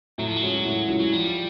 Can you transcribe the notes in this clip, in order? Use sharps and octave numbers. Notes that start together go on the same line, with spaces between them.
A2 F#3
F3
F#3
E3 G#3 C#4 F#4
A2
E3 G#3 C#4 F#4
F#3
F3 G3